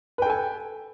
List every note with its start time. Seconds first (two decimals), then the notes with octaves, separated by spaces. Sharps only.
0.18 B4
0.22 G5
0.26 A4
0.30 G#5